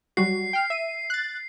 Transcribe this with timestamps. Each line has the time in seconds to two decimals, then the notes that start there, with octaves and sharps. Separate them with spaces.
0.17 F#3 G3 F#4 C7
0.53 G5 F6
0.70 E5 D#7
1.10 F#6 A6